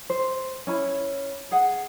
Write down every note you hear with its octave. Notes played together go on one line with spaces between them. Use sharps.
C5
C#4 E4 B5
G#4 F#5